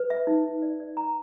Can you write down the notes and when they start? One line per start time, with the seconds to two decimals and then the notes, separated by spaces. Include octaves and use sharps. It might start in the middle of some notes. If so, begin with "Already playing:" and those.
Already playing: B4
0.10 E5
0.27 D#4
0.45 B4
0.62 D5
0.80 D5
0.97 A#5